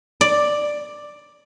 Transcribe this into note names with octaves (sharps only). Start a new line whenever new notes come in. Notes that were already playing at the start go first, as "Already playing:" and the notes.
D5